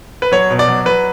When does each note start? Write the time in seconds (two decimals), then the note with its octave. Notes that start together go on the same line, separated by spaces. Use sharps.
0.22 B4
0.32 F#3 C#5
0.50 B2
0.59 D5
0.68 F#3
0.85 F#3 B4